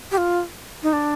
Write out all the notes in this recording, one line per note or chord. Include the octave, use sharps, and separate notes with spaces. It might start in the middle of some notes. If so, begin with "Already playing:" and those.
G4
F4
D#4
D4